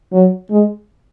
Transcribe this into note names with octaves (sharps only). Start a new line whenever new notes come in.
F#3
G#3